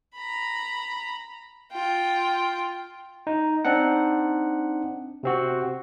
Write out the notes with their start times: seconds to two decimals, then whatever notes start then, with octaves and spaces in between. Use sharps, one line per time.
0.16 A#5 B5
1.72 F4 G5
3.27 D#4
3.65 C4 D4 D#4 F#5
5.23 C3 C4 F#4